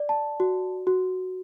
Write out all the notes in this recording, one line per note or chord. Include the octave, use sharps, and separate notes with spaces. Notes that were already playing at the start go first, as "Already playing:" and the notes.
Already playing: D5
A5
F#4
F#4